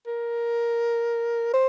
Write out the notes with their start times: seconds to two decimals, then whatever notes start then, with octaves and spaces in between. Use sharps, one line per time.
0.07 A#4
1.54 C5